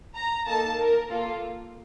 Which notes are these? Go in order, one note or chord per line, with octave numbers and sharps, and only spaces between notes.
A#5
A#3 D#4 A4 A5
A#4
A#3 F4 A4